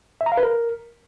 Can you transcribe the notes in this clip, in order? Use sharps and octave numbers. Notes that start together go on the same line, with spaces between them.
E5
A#5
F5
B4
A#4